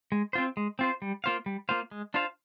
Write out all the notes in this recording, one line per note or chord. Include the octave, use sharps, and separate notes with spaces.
G#3
C4 F4 C5
G#3
C4 F4 C5
G3
A#3 F4 C5 F5
G3
A#3 F4 C5 F5
G#3
D4 F4 C5 F5